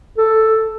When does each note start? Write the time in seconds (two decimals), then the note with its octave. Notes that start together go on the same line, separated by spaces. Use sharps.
0.18 A4